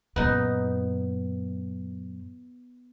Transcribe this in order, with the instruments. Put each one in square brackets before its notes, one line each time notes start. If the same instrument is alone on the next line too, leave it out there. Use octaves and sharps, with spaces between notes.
[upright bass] F#2 A#2 [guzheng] B3 D#4